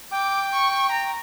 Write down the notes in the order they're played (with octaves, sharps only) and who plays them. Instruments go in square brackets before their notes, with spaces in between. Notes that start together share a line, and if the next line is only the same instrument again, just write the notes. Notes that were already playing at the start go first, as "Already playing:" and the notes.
[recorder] G5 [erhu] D6
[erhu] C#6
A#5